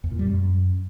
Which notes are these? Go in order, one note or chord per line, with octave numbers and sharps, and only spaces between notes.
E2
A#2
G3
F#2